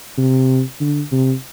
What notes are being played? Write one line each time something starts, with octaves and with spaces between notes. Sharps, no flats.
C3
D3
C3